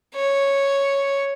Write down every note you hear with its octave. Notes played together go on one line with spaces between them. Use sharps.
C#5